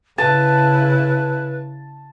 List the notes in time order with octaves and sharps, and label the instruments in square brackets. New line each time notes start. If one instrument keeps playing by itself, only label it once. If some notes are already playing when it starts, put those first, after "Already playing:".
[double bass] C#3 E4 [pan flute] B4 [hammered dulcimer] A5